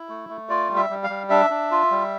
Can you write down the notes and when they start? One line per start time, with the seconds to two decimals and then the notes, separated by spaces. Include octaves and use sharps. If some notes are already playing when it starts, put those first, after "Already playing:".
Already playing: E4
0.09 A3
0.29 A3
0.49 F4 D5
0.70 G3
0.76 E5
0.90 G3
1.04 F5
1.10 G3
1.30 D4 E5
1.50 D4
1.71 F4
1.91 G3